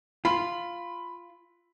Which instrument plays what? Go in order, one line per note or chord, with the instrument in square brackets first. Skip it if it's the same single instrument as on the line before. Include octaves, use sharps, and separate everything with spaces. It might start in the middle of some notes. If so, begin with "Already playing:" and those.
[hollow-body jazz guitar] F4 [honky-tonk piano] B5